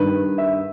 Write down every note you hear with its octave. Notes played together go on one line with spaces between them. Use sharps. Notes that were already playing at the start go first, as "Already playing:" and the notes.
Already playing: G2 D#3 B4
E5